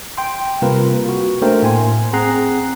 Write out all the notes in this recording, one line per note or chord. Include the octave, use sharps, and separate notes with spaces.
G5 C6
C3 G3 A#3 F4 A#4 B4
F#4
A3 A#3 D4 A#4 C5 G5
A2 G#5 C6
C4 G#4 F#5 A#5 F#6 C7